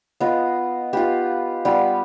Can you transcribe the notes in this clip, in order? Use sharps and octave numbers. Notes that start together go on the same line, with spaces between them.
B3 F4 D#5
B3 F4 G4
G3 B3 F4